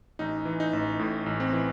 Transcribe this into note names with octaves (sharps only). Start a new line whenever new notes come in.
A1 D#4
E3
D#4
A1
A2
A1
C4
E3